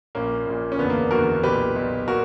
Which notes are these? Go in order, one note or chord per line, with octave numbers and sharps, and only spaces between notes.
A#1 A#2 A#3 C#4
A#1 A#2
C#4
F#1 E2 D3 B3
A#3
F#1 E2 D3 F#4 A#4
B1 A#2 G4 B4
B1 A#2
A#2 F#4 A#4